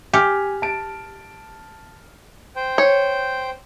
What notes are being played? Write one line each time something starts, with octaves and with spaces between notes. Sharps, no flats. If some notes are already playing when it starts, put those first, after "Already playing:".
G4 G#5 F6
A5 D7
C5 G5
C#5